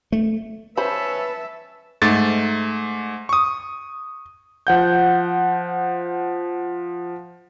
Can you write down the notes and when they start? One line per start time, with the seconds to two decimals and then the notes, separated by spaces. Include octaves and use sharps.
0.12 A3
0.77 C#4 B4 C5 E5 A5 B5
2.02 G#2 A3 A6
3.29 C#6 D#6
4.67 F3 F#5 G6